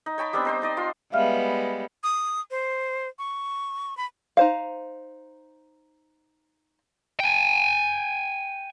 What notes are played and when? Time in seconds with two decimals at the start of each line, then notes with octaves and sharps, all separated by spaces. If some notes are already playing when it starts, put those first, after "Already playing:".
0.06 D#4
0.18 C#5 G5 A5 B5
0.33 G3 B3 C4 D4
0.45 D#4 C5 G5
0.62 D#4 D5 D#5
0.77 F4 C6
1.12 G3 G#3 B3 E5 F5 F6
2.03 D#6
2.51 C5
3.19 C#6
3.97 B5
4.37 D#4 C5 F5
7.20 G5 G#5